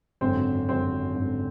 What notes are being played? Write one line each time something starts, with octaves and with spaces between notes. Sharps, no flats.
G#1 F#2 D3 C4
G#1 F#2 D3 C4
G#1 F#2 D3